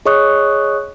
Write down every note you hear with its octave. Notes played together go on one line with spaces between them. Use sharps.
G#4 C#5 D#5 C#6 D#6 F#6